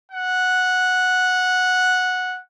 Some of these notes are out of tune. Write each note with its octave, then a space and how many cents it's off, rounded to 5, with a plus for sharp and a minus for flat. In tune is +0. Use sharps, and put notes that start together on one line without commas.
F#5 -10